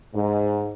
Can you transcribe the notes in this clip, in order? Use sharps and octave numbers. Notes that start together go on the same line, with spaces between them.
G#2